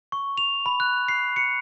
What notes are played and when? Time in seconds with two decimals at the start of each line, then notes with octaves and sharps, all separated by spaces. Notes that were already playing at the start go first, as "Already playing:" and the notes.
0.12 C#6
0.38 F7
0.66 B5
0.80 F#6
1.08 C7
1.36 C#7